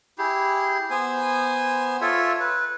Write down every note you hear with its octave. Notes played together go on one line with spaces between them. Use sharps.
E4 G4 G#4
B3 C5 G#5
F4 A4 C#5 E5
B4